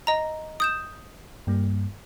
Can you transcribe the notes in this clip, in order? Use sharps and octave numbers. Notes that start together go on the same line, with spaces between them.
D#5 A#5
D#6 G6 E7
G2 G3 A#3